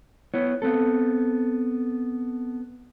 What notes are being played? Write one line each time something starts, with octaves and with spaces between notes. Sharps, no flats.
B3 E4 C#5
B3 C4 A4